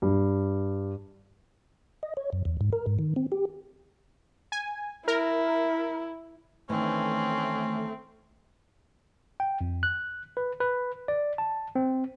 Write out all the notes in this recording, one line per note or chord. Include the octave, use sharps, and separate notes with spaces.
G2
D#5
C#5
F#2
E2
G#2
A#4
G#2
D#3
C4
G4
G#5
E4 A#4
D#3 E3 A3 C4 C#4
G5
F2
F#6
B4
B4
D5
A5
C4